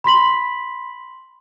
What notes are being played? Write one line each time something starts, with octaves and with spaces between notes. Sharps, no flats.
B5 C6 B6 F#7